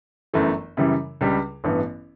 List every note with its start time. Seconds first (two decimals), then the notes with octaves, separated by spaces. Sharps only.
0.34 G1 F#2 E3 A3
0.77 F#2 C#3 E3 G3
1.21 C#2 C#3 G3 D4
1.64 A1 G2 E3 B3